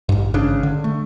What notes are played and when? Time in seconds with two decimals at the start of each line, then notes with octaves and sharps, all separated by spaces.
0.09 A1 G2
0.34 G#1 C#3 D4
0.63 D3
0.84 A3